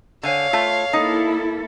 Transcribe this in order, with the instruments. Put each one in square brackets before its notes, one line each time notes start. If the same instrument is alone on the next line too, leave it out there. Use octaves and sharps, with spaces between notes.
[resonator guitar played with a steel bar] D3 G#5 [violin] C#5 F5
[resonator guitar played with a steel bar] A3 F4
[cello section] A#3 E4 A4 [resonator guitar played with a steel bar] D#4